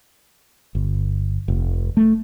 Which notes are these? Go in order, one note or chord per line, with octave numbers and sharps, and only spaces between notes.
G1
F1
A3